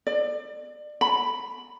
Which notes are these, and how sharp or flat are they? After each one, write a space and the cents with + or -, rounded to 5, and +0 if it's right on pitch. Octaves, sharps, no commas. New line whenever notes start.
D5 +30
B5 +5